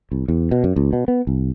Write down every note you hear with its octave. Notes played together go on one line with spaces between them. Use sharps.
C2
E2
B2
F#2
C#2
B2
B3
C2